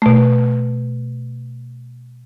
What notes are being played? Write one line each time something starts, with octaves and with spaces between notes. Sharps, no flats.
B2 A3